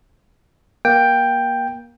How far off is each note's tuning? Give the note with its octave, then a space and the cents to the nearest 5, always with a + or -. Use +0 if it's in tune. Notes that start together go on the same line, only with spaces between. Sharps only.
A#3 +20 G5 +5